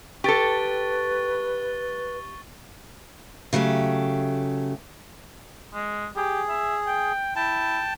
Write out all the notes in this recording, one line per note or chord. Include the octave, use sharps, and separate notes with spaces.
G4 A4 B4 C#6 A6 G7
C#3 F#3 A3 G4
G#3
G4 G#4
E5
G5
E4 G5 A5